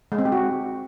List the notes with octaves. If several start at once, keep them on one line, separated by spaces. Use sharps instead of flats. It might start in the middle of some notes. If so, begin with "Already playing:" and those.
G#3
C4
G4
F#4